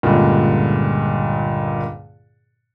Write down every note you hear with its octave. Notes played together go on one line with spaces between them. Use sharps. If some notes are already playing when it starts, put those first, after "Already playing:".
C#2 G2 A#2 D3